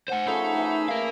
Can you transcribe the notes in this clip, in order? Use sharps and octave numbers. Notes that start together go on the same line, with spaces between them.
C5 F#5 G#5
F3 A3 C#4 D#4 G#4 B5 E6
E3 A3
A#4 F5